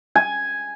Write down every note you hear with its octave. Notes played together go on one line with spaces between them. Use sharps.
G#5